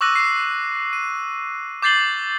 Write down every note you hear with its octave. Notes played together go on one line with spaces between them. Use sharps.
C#6 D6 E6 F#6 A#6 D#7
C7
D#7
D6 G6 A6 C7 F#7 G7